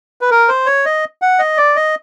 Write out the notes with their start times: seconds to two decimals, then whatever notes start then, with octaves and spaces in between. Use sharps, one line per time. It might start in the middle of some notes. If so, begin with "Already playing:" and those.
0.21 B4
0.31 A#4
0.48 C5
0.66 C#5
0.86 D#5
1.22 F#5
1.39 D#5
1.58 D5
1.76 D#5